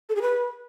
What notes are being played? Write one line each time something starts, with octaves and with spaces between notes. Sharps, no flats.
A4
G#4
B4